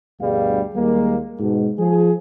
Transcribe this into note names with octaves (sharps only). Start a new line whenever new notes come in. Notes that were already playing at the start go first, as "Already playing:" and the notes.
D2 G2 B2 G3 G#4 F5
D#2 G3 G#3 A#3
G#2 B2
F3 G#4